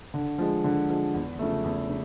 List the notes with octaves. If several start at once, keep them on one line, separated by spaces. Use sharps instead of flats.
D3
F3 G#3
D3
F3 G#3
E2
C#3 F3 A3
E2
C#3